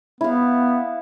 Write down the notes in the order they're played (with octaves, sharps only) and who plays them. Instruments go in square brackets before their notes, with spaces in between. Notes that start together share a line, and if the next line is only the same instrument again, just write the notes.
[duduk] B3 [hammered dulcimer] E4 F5